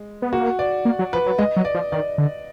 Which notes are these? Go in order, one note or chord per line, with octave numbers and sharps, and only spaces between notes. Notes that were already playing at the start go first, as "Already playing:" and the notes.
Already playing: G#3
B3
A#3 F#4
D5
A#3
F#3
F3 B4
F#3
G#3 D#5
F#3
D5
F3
D#3 D5
D3